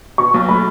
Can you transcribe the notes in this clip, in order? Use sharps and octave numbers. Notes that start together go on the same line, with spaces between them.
B2 C#6
B1
A3 B5